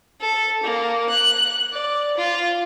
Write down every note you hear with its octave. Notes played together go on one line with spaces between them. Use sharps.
A4
A#3
F#6
D5
F4